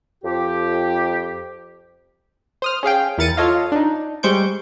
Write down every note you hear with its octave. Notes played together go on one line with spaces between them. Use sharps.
F2 G4
C5 D#6 F6
C#4 G#4 F5 G5
E2 E4 A#4 A6 C#7 D#7
F4 A4 C#5 D#5 F5
D4 D#4
G3 G#3 C5 C#6 G6 D7